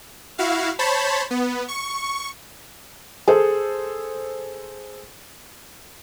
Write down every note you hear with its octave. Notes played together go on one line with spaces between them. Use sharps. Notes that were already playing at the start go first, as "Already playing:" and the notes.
E4 F#4 F5
C5 C#5 A5 B5
B3
C#6
G#4 A4 C5